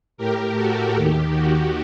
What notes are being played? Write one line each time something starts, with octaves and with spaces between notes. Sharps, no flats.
A2 G4 A#4
F#4 A4
D#2 D#3 G4
F#4